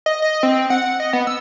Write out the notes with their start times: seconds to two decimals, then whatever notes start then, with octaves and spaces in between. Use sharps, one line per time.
0.06 D#5
0.22 D#5
0.43 C4
0.70 F#5
1.00 D#5
1.13 B3
1.27 E6